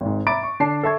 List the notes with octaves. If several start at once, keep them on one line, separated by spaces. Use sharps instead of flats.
G#1 G#2
E5 A#5 B5 D6 A6 D7
C#6
D3 D4 A5 C7
A4 E5 C#6 G#6